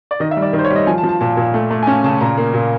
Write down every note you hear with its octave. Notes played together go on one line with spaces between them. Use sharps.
D5
D#3 D#5
E5
G3
D5
D#3
C5
C#5
G3
D#5
F3 G#5
A5
F3
A5
A#2 A5
A#2
A3
A3
G#5
C#4 A5
C#3 A5
A#2 A#5
A#3
A#2